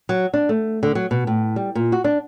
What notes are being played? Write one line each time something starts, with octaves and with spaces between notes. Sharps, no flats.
F#3
D4
A3
D3
F#3
B2
A2
G3
A#2
F#4
D4